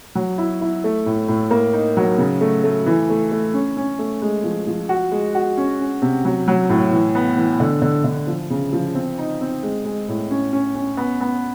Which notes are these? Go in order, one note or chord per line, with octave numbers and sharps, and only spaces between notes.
F#3
E4
E4
A3
A2
A2
A#3
D#4
F#3
C#3
A3
A3
E3
A3
A3
C#4
C#4
A3
G#3
F3
F3
F#4
G#3
F#4
C#4
C#4
C3
F#3
F#3
A2
E3
B3
E3
D3
D3
D3
F3
C#3
F3
C4
D#4
C4
G#3
G#3
A2
C#4
C#4
C#4
B3
B3